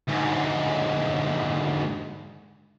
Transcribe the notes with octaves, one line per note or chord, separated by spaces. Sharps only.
D2 G#2